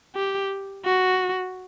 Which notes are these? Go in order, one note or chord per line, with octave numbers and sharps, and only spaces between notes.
G4
F#4